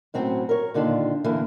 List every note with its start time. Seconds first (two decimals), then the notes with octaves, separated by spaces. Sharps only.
0.14 A2 F#3 C4 C#4 F#4
0.49 A#4 C#5
0.74 A#2 D3 D#3 D4 F4
1.24 A#2 D3 E3 A#3